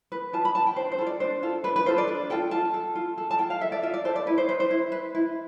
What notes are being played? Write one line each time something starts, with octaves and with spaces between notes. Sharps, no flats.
B4
F4 A5
B5
B4 A5
G5
D4 C5
C5
A4
F4
D5
D4 C5
F4 A4
D4 B4
B4
F4 A4 C5
D5
D4
F4 A4 G5
F4 A5
A4
F4
A4
A5
F4 G5
F5
A4 E5
D5
F4 E5
D5
A4 C5
D5
E4 B4
C5
B4 C5
C5
E4
B4
E4